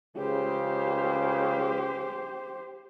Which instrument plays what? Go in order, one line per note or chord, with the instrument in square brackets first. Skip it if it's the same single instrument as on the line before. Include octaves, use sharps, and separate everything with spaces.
[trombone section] C#2 C#3 [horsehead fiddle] G4 C5